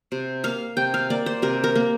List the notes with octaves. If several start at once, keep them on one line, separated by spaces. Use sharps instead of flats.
C3
A#3 F5
C3 G5
F5
A#3 D5
C5
C3 A#4
A#4
A#3